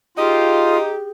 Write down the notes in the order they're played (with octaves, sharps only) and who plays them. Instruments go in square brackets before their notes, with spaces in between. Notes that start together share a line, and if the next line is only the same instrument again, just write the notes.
[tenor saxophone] D#4 [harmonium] F4 [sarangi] G4 [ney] G#4